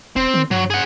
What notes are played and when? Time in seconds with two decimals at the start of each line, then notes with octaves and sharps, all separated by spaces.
0.16 E1 C4
0.34 D#3
0.51 G2 F#3
0.70 G#4 F#5